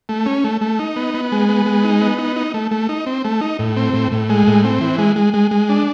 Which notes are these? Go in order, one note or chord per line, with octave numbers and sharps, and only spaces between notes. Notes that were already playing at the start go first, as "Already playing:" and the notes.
A3
C#4
A3
A3
D#4
B3
B3
G#3
B3
G#3
D#4
B3
D#4
D#4
A3
A3
D#4
C4
A3
D#4
A2
C4
A2
A2
G#3
A2
C4
E3
G#3
G#3
G#3
G#3
D4